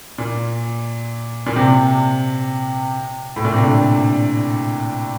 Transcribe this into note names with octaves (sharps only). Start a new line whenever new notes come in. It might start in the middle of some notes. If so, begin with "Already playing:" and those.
A#2
A#2
C3
A2
A#2
C3
D3